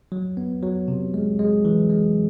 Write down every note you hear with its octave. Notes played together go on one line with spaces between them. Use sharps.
F#3
B3
F#3
C3
G#3
G#3
E3
G#3